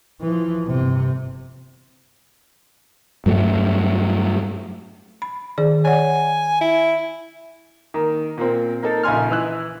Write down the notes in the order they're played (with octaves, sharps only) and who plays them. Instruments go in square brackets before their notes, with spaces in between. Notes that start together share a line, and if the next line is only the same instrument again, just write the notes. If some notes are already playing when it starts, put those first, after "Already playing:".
[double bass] E3 F3
G1 C3
[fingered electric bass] G2 F#3 A3
[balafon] B5
D#3 G#4 D5
[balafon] C#5 D5 F#5 [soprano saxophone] G#5
[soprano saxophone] E4
[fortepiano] D#3 A#3
A#2 A#3 C4
A#3 D#4 A4
A#1 C#3 D#4 G#5 C6 F6
E3 E6 F#6